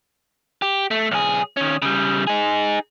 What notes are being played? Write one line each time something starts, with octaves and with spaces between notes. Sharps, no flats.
G4
A3
B1 G#4
D#3 C#4
C#3 G3
D#4 G#4